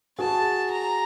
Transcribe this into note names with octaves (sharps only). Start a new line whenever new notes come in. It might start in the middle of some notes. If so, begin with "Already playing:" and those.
F#4 G#4 A5
A#5